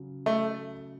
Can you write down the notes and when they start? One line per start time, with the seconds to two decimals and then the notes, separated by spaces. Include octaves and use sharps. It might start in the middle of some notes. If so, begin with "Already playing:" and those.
Already playing: C#3 F#3
0.26 A3